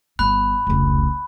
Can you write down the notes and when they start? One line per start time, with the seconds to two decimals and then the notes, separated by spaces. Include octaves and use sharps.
0.19 G1 B5 F#6
0.67 F1 C#2